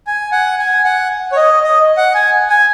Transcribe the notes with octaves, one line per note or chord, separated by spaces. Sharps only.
G#5
F#5
G#5
F#5
C#5
D#5
D#5
F#5
G#5
G#5